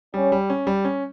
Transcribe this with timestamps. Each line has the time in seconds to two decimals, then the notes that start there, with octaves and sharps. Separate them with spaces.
0.14 G3 C#4
0.32 G3
0.50 C#4
0.67 G3
0.85 C#4